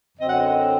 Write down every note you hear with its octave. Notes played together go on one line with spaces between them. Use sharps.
F#2 D3 F#3 C4 D#5
F#5
D#5